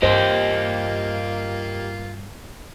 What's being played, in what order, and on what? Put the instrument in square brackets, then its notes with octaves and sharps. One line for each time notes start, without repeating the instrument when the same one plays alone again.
[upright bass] G2 [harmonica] A#3 F4 [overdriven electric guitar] G4 D#5 [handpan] C5